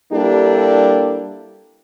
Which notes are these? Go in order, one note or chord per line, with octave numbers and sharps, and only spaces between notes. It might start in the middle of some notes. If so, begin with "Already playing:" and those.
G3 A#3 D4 E4 G4 A4